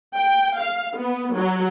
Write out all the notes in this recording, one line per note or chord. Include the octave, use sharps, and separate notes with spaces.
G5
F5
B3
F#3